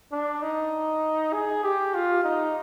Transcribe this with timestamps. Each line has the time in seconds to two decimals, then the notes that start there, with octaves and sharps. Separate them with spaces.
0.12 D4
0.42 D#4
1.33 G#4
1.63 G4
1.94 F4
2.24 D#4